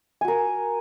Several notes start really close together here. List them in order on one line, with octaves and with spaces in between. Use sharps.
G#5 F#4 A#4